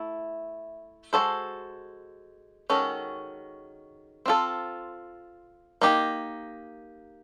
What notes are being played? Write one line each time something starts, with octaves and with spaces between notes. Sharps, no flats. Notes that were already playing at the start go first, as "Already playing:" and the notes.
Already playing: A3 E4
G#3 C#4 F#4 A4 C5
D#3 G#3 C#4 F#4 A4
C4 F4 A4
A#3 D#4 G4